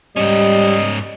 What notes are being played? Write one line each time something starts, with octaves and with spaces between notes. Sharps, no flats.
G#2 G3 C#4 D#5